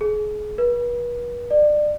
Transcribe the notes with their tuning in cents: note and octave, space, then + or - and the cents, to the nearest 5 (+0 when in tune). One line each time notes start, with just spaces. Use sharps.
G#4 +30
B4 -40
D5 +25